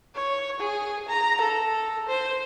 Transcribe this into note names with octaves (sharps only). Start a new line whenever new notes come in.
C#5
G#4
A#5
A4
C5